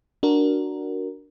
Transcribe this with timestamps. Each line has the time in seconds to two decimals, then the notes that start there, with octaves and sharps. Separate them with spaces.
0.23 D4 F#4 A#4